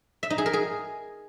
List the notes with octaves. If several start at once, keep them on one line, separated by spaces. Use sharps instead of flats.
E5
D#4
G#4
A#4
G#4